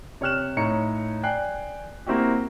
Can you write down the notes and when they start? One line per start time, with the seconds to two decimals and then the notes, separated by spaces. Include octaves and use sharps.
0.21 C3 C#5 G5 F6 F#6 E7
0.57 A2 D#4 C#5 A#5 C#7
1.23 D5 G5 G#5 F#6 C7
2.07 A#3 C4 E4 F#4 G4